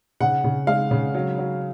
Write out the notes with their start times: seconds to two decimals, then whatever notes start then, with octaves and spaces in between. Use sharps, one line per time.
0.20 C#3 F#5
0.44 C#3
0.67 G#3 F5
0.91 C#3
1.15 F#3
1.38 F#3